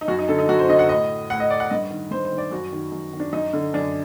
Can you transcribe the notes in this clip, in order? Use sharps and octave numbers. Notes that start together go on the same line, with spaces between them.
D#4
F#2 F#4
D#4
D3 A4
D#4
F#2 F#4
C5
D3 D#5
F#5
A2 D#5
A2 F#5
D#5
D5
F#5
G2 D#5
D#3
G2 C5
C5
D#3
D5
F#2 F#4
D#3
F#2
D#3
D4
F#2 D#4
D3
F#2 D4